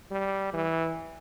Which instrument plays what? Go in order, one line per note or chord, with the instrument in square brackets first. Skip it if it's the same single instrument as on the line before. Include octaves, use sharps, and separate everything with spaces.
[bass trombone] G3
E3